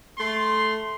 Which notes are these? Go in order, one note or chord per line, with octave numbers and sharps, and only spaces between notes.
A3 C6